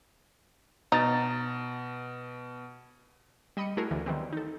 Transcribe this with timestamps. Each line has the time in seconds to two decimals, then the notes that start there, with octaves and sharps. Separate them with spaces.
0.92 B2 D#4 A6
3.57 G3 D#5 B5 D#6 C#7 D#7
3.77 A3 E4 F#4 G#4 A#4
3.91 D2 D3 E3
4.06 D#3 E3 F#3 G3 B3 C4
4.33 D#4 A4